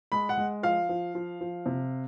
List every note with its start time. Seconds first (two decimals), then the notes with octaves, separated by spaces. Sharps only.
0.12 G#3 B5
0.29 F#5
0.37 G#3
0.63 F3 F5
0.89 F3
1.15 F3
1.41 F3
1.66 C3